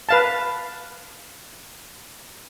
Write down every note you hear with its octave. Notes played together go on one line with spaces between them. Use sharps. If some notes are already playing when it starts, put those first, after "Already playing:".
B4 F5 A5